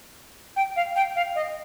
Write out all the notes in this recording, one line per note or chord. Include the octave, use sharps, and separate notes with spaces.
G5
F5
G5
F5
D#5